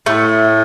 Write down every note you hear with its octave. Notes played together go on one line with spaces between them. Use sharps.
A2 A3